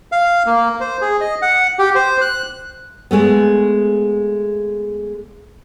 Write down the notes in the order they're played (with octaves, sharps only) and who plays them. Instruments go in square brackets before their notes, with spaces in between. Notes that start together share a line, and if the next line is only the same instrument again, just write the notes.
[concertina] F5
A#3
C5
G#4
D#5
F#5
G4
C5
F#6
[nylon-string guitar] G#3 A3 B3